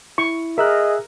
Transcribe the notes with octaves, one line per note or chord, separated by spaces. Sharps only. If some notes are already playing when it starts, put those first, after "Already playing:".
E4 C#6
G#4 A#4 D#5 E5 E6 F#6